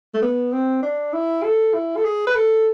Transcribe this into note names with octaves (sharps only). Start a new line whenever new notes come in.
A3
B3
C4
D4
E4
A4
E4
A4
G#4
B4
A4